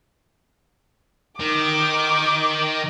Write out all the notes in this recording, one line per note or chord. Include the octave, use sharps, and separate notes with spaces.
D#3 D6